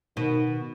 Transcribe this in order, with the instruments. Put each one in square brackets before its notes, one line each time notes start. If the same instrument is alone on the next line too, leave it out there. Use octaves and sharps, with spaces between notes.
[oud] B2 [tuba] D#3